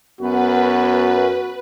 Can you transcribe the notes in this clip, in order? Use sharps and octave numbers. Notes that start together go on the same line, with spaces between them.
F#2 B3 F#4 B4